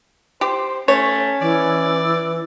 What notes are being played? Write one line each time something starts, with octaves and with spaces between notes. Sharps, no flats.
G4 C5
A3 C#4 C#5
E3 D5